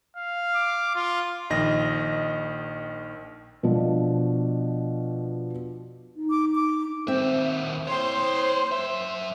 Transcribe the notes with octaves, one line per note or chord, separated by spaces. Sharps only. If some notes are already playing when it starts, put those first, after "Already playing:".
F5
D6
F4
A#1 D#3 D#5 A#6
B2 F3 D4
D#4
D6
D6
D#2 C4 E5
C5 C#5 G5
F#2 E5